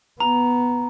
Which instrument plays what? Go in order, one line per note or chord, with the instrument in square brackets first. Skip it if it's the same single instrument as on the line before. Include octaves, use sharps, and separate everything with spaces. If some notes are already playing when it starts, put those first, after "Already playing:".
[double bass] B3 [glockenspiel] A#5